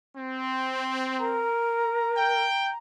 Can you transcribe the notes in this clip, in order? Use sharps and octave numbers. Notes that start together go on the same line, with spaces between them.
C4
A#4 A#5
G5